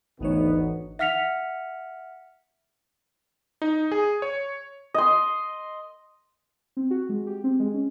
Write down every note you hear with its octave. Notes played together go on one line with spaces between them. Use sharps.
G#1 D2 E3 B3 D#4 C#5
E5 F#5 F6 B6 C#7 F7
D#4
G#4
C#5
D#5 C6
C4
F#4
G#3
G4
C4
G#3
C#4